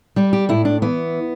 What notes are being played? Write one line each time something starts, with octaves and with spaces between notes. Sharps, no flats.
G3 G4
G4
A2 E4
D4
E3 B3